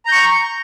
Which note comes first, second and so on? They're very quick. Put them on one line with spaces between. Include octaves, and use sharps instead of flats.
A#5 G6 C#6